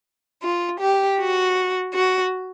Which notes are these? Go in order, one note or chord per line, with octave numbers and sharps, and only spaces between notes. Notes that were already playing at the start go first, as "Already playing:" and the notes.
F4
G4
F#4
F#4